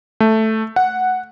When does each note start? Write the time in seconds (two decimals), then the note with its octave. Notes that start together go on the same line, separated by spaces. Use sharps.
0.20 A3
0.76 F#5